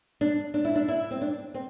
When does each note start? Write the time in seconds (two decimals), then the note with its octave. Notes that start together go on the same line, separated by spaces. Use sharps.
0.21 D4
0.54 D4
0.65 E4
0.75 D4
0.88 E4
1.11 C4
1.21 D4
1.54 C4